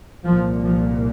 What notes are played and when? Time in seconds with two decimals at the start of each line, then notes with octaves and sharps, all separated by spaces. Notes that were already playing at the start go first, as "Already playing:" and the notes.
0.24 C2 A#2 F3
0.63 F3